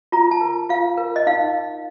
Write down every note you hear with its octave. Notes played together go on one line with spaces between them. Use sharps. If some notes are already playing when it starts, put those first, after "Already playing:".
F4 A#5
A5
A#4
F4 F5
A#4
D#5
D#4 F5